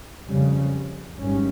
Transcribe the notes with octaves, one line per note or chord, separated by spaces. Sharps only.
F2 C#3 G3
G#1 G#2 G3 C#4